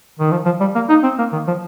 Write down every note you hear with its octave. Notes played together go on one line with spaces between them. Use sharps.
D#3
F3
F3
G3
A#3
D#4
C4
A#3
D#3
F3